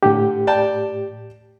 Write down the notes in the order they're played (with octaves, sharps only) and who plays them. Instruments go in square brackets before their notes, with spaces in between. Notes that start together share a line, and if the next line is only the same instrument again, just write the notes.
[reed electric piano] A2 G4 [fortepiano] D3
[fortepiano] D5 G5 A5